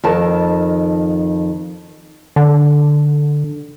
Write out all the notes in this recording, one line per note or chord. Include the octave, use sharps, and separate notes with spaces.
F2 D#3 A5
D3